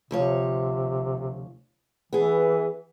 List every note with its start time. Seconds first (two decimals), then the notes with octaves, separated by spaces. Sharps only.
0.11 D2 C3 F3 C#5
2.13 E3 B3 G#4